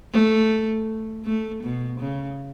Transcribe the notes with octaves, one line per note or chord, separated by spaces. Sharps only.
A3
A3
B2
C#3